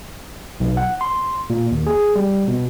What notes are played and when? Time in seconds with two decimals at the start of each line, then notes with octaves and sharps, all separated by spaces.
0.60 B1
0.77 F#5
1.01 C6
1.50 A#2
1.72 D#2
1.87 G#4
2.16 G3
2.48 B2